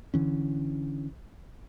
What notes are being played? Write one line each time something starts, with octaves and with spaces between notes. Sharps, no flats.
D3 E3 C#4